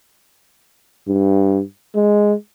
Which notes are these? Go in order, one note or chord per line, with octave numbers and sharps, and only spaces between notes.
G2
G#3